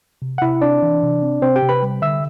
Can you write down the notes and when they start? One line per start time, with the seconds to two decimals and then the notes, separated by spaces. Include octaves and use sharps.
0.22 C3
0.38 F#5
0.41 C3 E4 E5
0.62 C4 D4 D5
0.83 E3
1.03 C3
1.22 C4
1.42 C3 C4 C5
1.56 G4 G5
1.63 C3
1.69 B4 B5
1.83 G3
2.02 D3 E5 E6